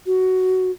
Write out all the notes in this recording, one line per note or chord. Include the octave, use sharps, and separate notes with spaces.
F#4